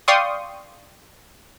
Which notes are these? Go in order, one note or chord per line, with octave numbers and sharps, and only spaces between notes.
D5 F5 G5 C6 C#6 D#6